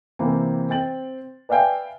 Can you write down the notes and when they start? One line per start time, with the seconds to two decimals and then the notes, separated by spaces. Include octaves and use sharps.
0.19 C3 E3 A#3 C4
0.69 C4 G5 A6 F#7
1.49 B4 D5 E5 F5 G5 G#5